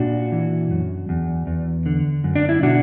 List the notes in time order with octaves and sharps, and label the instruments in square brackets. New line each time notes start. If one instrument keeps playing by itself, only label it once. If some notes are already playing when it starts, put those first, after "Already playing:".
Already playing: [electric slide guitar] A#2 D4 F#4
E3
F#2
E2
E2
D3
F#2
D4
E4
B2 D4 F#4